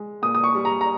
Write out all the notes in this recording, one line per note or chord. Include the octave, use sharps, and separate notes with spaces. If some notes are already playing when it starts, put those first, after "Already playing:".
Already playing: G#3
A#2 D#6
D#6
C#6
G3
A#5
A#5